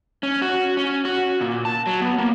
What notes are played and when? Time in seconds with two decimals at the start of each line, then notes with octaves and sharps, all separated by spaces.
0.23 C#4
0.42 F#4
0.77 C#4
1.05 F#4
1.41 A#2
1.65 A5
1.87 F#3
2.01 B3
2.18 A#3